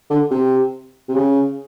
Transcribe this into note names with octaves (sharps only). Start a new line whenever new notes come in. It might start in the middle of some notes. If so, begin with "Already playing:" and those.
D3
C3
C3
C#3